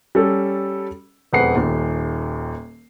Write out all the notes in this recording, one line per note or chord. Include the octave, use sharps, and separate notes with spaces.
G3 C#4 A4
E1 F2 B4 F#5 C7
D#1 D#2